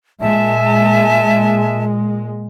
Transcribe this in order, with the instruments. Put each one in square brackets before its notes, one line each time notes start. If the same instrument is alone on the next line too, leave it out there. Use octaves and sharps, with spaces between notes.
[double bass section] A#2 G#3 [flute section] E5 G#5 A5